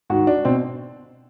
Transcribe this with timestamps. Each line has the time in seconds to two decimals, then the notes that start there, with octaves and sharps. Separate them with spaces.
0.10 G#2 D#3 F#4
0.27 D4
0.45 B2 C4